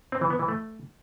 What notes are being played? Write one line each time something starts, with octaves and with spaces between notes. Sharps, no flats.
C4
E3
B3
E3
A3